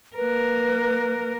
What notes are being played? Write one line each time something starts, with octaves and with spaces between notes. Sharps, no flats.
A#3 A#4 B4